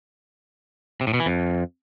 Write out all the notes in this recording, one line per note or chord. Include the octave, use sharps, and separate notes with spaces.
C3
A2
B2
E3
F2